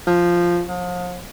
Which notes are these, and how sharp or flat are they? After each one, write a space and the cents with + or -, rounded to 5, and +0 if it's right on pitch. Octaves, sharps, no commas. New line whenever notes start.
F3 -5
F3 +40